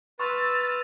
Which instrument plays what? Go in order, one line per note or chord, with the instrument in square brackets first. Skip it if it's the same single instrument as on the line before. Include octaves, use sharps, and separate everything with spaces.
[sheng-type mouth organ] B4 [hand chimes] C6 C#6 [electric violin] E6 F6 [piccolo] A6